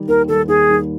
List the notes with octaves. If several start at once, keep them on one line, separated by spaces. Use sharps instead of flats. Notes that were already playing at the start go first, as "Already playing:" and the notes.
Already playing: D#3 G3
D#2 A#4
D#3 G3 A4
D#2 G#4
D#3 G3